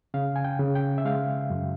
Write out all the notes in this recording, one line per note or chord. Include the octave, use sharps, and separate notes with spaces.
C#3 F5
G#5
G5
C#3
G5
E5
G#3 F5
F#2